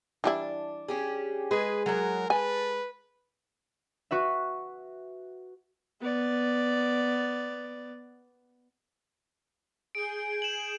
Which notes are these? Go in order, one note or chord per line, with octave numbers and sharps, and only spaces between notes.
E3 G3 D4 E4
C#4 G4 G#4
G#3 G#4 B4
F#3 A#4 C#5 F#5
A4 B4 G#5
F#4 B4 E5
B3 D5
G#4 G6 D7
E7 F#7